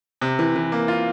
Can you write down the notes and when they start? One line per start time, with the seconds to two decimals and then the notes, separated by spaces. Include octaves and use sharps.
0.22 C3
0.39 E3
0.56 E3
0.72 A#3
0.88 F4